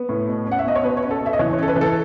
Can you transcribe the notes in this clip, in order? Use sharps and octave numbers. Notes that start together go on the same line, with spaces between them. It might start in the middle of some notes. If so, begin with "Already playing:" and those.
Already playing: B3
A2
B2
C#4
F#5
E5
B2 D#5
C#5
B2 B4
C#5
C#4
A4
B2
E5
D#5
E3 C#5
C#5
C#4 A4
B4
E3
A4